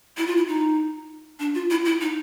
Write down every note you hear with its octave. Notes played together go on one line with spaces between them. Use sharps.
E4
F4
E4
D#4
D4
F4
E4
E4
D#4